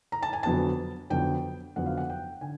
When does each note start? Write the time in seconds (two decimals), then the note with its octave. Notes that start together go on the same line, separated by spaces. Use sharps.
0.12 A#5
0.22 A5
0.33 G#5
0.43 F2 D3 F#3 B3 A5
1.10 F2 D3 F#3 B3 G5
1.76 F2 D3 F#3 B3 F#5
1.86 F5
1.97 F#5
2.10 G5
2.41 D3 G#5